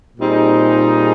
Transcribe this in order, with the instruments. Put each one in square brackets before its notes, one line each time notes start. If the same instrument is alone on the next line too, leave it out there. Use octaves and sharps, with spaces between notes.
[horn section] A#2 G3 C4 D#4 G#4